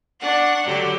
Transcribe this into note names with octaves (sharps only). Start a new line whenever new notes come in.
D4 F#5 C#6
D3 F#3 F#4 G4